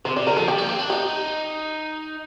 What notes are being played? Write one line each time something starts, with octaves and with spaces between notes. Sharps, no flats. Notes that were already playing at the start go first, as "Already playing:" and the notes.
C3 C5
C3 D5
D3 A#4
F3 A4
G3 G4
A#3
C4
D4
D#4 G4